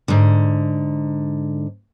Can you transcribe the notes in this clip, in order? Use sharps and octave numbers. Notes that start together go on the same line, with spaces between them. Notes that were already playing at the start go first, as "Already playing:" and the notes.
G#2 D3